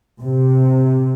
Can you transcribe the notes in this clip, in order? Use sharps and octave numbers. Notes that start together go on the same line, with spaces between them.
C3